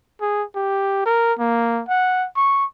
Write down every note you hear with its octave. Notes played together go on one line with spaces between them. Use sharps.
G#4
G4
A#4
A#3
F#5
C#6